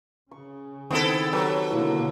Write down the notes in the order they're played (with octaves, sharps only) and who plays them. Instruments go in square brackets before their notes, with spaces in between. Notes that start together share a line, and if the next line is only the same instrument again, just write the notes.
[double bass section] C#3 [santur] C#6
[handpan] D#3 C4 [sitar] B3 E4 A4 [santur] C#6
[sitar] F#3 [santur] G4 A4 B4
[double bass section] B2 D3 A#3 [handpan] E4